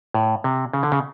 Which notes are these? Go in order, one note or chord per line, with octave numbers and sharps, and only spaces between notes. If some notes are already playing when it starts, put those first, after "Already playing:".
A2
C3
C#3
D3
C#3